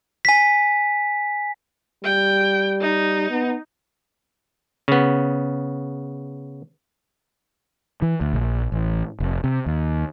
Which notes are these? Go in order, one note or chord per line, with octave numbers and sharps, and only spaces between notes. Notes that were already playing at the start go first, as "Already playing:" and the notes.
G#5 B6
G3 G5
D#4
B3
C#3 B3
E3
D2
A#1
A1
F1
C3
D#2